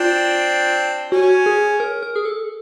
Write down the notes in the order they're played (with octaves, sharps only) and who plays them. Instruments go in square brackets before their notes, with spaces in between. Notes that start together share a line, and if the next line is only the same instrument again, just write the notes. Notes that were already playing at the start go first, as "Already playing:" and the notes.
Already playing: [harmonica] C4 D4 [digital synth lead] F4
[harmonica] C#4 [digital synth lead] F#4
[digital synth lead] G#4
A#4
A#4
G#4
A4